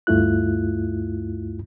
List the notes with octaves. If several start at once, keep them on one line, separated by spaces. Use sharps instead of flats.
D2 G2 A3 E4 F4 F#6